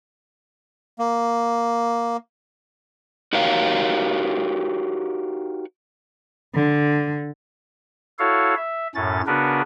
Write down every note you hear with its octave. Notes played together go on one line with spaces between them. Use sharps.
A#3
D#4 F#4 G4 A#4 C#5 F5
D3
E4 F#4 A4 C#5 F5
E5
F#2 A2 C#4 A6
C#3 B3 D4 F#4 A#4 B4